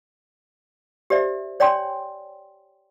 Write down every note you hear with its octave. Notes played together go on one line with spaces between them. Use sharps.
G4 C5 D5 E5
C#5 D5 G5 G#5 C6